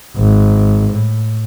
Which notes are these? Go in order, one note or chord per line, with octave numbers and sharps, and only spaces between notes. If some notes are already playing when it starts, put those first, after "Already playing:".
G#1
A2